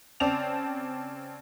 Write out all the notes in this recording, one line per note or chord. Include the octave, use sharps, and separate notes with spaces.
C#3 C4 D5 A5 F7